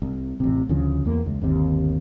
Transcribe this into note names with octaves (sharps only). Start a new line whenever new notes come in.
C2
A1 C3
D2 C#3 F3
E2 A#3
C#2
G1 D#2 C3